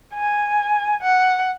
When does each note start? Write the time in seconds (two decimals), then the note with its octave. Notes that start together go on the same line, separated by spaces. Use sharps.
0.15 G#5
1.03 F#5